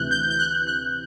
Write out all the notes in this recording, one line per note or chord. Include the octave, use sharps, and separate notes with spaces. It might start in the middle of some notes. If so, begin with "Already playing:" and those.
Already playing: D2 C3 E3 F#6 G6
G6
G6
F#6
F#6